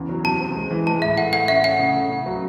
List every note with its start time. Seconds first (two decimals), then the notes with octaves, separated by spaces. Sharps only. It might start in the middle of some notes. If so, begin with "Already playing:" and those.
Already playing: E2 C#3
0.09 F#3
0.24 C3 A5
0.40 C4
0.55 G#3
0.71 E3
0.86 G#3 A5
1.02 A2 E5
1.17 A3 F#5
1.33 A3 F#5
1.48 C#4 E5
1.64 C#4 F#5
1.79 C#3
1.95 A3
2.10 C#3
2.26 F#3